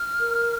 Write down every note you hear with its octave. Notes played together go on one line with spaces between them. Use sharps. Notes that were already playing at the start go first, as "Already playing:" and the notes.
Already playing: F6
A#4